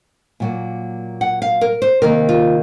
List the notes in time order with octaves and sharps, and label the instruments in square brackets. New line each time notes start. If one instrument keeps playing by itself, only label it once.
[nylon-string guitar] A#2 F#3 A#3
F#5
F5
A#4
C5
C3 D#3 A#3 A#4
F4